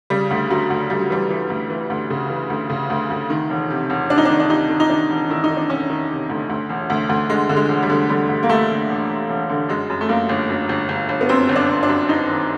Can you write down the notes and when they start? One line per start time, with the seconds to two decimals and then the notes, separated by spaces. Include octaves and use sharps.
0.10 C#3 G3
0.31 D2
0.50 D2 F#3
0.70 D2
0.90 D2 G3
1.01 F#3
1.10 E3 G3
1.30 E3
1.50 D2
1.70 E3
1.90 D2
2.10 C#3
2.30 E3
2.50 D2
2.70 C#3
2.90 D2
3.10 D2
3.30 D#3
3.50 E1
3.70 C3
3.90 E1
4.10 C3 D4
4.18 D#4
4.25 D#3 D4
4.40 D4
4.49 C3 D#4
4.69 D#3
4.80 D#4
4.90 D#3 D4
5.10 E1
5.30 D#3 E4
5.44 D#4
5.50 D#3
5.57 D4
5.70 E1 C#4
5.90 D#3
6.10 C3
6.29 D2
6.49 D2
6.69 E1
6.90 D2
7.09 D2
7.30 D3 G#3
7.49 D3
7.56 G#3
7.69 E1
7.83 G3
7.89 D3
8.09 D3 G3
8.29 D2
8.43 A#3
8.49 D2 A3
8.69 D3
8.89 E1
9.09 E1
9.30 E1
9.49 D3
9.69 F#2 G#3
9.90 F#2
10.01 A3
10.09 F#2 A#3
10.29 G1
10.49 F#2
10.69 G1
10.89 G1
11.09 G1
11.21 B3
11.29 F#2 C4
11.49 G1
11.56 D4
11.69 G1
11.83 D4
11.89 F#2
12.09 G1 D#4
12.29 D#3